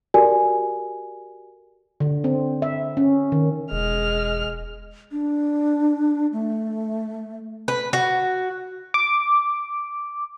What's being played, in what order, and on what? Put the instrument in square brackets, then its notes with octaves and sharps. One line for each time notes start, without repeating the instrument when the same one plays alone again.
[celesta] F#4 G4 A4 A#4 D5 G#5
[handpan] D3
C4
E5
C#4
D#3
[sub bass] E1 [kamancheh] G#3 F6
[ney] D4
A3
[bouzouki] B4
F#4
[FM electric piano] D6